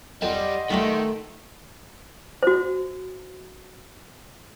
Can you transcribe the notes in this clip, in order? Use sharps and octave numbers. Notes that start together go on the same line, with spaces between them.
F2 G3 D#5 F#5 C6
D#3 G3 A3 F4 G4
F#4 C5